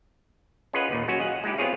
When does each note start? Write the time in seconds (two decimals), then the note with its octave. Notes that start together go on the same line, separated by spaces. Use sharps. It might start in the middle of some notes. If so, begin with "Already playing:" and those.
0.73 C#4 F4 G#4 B4 D#5 F#5
0.90 D#2 A#2
1.08 F#3 C#4 F#4
1.19 G#4 D#5 F5 F#5
1.44 G#3 D#4 E4 G4
1.58 B3 C4 F4 G#4 C#5 F5